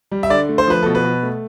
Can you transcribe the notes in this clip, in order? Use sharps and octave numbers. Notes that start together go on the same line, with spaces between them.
G3
E5
D3 D5
A3
C5
F3 B4
B2 A4
B4
B2
A3